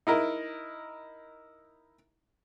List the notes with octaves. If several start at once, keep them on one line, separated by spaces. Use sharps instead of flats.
D#4 E4 A#4